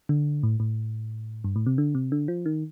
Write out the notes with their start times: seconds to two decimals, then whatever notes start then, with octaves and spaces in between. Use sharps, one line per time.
0.09 D3
0.43 A2
0.60 A2
1.44 G2
1.56 A2
1.66 C3
1.78 D3
1.95 C3
2.12 D3
2.28 F3
2.46 D#3